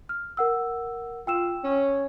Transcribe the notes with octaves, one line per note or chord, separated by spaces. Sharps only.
F6
A#4 F#5 E6
F4 G5 E6 E7
C#4